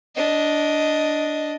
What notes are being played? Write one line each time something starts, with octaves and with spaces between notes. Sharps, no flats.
D4 D#5